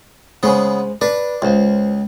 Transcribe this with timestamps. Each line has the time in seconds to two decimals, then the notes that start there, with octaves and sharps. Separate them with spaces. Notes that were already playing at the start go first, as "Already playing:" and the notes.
0.43 C#3 G#3 B3 G#4 C5
1.01 D4 B4
1.42 C#2 F4 C5 F5